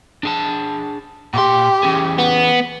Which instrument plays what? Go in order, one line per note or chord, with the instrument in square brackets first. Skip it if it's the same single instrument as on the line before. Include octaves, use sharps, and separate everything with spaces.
[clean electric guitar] D4 G#4 A5
[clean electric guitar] A#2 C6 [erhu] G4
[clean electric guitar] E3 C#4 G#4
[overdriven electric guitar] B3